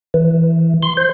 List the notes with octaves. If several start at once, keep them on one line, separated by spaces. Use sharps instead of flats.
E3
C6
C5